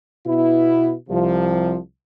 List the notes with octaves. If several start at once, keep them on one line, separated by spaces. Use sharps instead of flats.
B2 B3 E4
C2 C3 F3